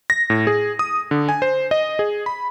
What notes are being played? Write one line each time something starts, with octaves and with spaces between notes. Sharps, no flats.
A#6
A2
G#4
D#6
D3
G#5
C5
D#5
G#4
B5